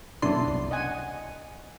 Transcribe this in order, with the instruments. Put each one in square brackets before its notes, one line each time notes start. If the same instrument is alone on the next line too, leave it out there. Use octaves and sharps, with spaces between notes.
[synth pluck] F#2 B2 C6 [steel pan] D4 E4 D5
[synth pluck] C2
[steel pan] D#5 F#5 G#5